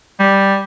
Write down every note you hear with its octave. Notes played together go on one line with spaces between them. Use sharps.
G3